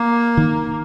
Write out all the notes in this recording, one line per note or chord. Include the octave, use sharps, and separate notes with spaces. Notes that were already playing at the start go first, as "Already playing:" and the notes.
Already playing: A#3
D#3